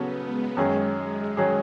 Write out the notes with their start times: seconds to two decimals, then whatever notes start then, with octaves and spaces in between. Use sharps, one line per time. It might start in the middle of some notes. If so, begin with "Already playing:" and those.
Already playing: C#3 F#3 B3 C#4 F#4 A4
0.16 G#3
0.57 F#2 D#3 F#3 G#3 C#4 G#4
1.37 D#3 F#3 C#4 G#4